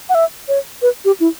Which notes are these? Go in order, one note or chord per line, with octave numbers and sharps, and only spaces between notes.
F#5
E5
C#5
B4
G4
E4